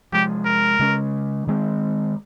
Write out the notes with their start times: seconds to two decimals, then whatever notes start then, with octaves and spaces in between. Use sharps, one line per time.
0.12 C3 F3 G#3 G4
0.46 A#4
0.79 C#3 G#3 C#4
1.47 D#3 G#3 C4